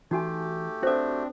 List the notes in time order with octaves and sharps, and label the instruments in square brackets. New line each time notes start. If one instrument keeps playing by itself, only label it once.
[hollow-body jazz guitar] E3 [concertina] A3 G4 [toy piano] D#4 F#4 G#5
[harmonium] C4 D4 [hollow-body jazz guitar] F#4 E5 [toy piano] A4 C5